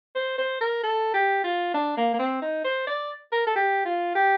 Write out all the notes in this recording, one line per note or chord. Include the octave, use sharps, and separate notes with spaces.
C5
C5
A#4
A4
G4
F4
D4
A#3
A#3
C4
D#4
C5
D5
A#4
A4
G4
F4
G4